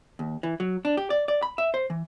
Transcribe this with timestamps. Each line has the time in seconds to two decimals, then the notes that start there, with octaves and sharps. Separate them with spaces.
0.19 D#2
0.43 E3
0.60 F#3
0.85 D4
0.97 G4
1.10 D5
1.28 D5
1.43 B5
1.58 E5
1.74 C5
1.90 E3